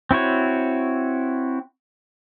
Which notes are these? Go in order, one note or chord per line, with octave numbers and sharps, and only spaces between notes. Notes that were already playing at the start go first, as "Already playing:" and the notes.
C4 E4 F#4 C#5